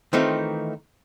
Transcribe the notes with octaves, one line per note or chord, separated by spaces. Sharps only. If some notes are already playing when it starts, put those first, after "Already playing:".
D#3 E3 A3 C4 D#4 F4